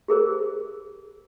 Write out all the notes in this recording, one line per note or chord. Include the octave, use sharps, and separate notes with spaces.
G4 G#4 A#4 C5